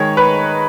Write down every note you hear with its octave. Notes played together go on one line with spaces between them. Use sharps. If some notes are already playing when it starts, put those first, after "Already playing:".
Already playing: D#3 G#3 C#5
B4